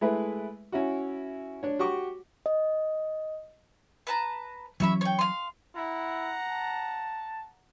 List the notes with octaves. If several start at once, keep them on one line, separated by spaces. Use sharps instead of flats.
G#3 A3 E4 B4
C#4 E4 F#4
D4 C#5
F#4 G4 C#6 D6
D#5
B4 A5 A#5
E3 F#3 C#4 C#5 E5 B5
C#5 G5
F5 C6
E4 F#5 A#5
A5